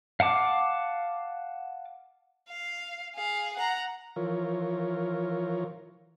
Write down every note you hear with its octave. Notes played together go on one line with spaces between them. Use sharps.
F5 F#5 A5 D6
F5
G#4 F5
F#5 A#5
E3 F3 F4 A#4 C#5